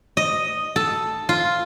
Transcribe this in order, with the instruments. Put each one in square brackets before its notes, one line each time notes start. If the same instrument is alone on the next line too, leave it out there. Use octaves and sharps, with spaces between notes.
[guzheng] D#5
A4
F4